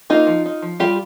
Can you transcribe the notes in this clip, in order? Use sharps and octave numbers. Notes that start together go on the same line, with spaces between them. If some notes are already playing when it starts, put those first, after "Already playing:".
A#3 D#4 F4
F3
D#4
F3
G3 F4 G4